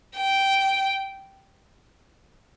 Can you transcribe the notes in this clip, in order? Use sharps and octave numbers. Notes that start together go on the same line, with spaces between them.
G5